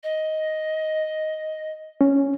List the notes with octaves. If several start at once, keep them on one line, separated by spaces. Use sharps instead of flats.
D#5
C#4